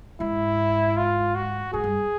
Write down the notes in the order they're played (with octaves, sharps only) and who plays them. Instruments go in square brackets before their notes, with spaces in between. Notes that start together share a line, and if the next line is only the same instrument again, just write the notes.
[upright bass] G#2 [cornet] E4
[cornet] F4
F#4
[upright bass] G#2 [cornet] G#4
[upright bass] G2